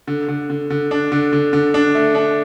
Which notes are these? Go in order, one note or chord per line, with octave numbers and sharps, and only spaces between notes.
D3
D3
D3
D3
D4
D3
D3
D3
D4
A3
D4